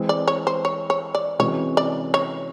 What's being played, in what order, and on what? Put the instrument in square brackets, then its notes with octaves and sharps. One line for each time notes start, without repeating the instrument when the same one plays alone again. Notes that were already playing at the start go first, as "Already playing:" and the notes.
Already playing: [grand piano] E3 G#3 C4
[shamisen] D5
C#5
C5
C#5
C#5
D5
[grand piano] C3 E3 G#3 C#4 F#4 [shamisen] C#5
[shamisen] D5
C#5